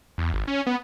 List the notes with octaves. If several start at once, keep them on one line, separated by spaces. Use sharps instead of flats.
E2
G#1
C#4
B3